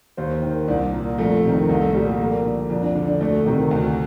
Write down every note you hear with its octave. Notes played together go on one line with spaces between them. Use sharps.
D#2 C5
D#3
C2 D4
A#2
F2 A3
C3 D#3
C2 A3
A3
A#2 G3
A3
F2 A#3
D3
F2 D4
D4
D3
D4
D2 A3
C3 D#3
D2